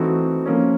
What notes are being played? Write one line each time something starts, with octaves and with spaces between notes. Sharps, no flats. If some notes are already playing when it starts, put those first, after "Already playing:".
Already playing: E3 A3 C4 D#4 F#4
F3 A#3 C#4